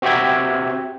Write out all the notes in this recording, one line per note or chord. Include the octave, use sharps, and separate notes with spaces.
C4 F#4 G4 E5 G5 G#6